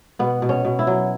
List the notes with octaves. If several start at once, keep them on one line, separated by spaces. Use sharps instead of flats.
B2 B3
B2
C#4
B2
E4
F#3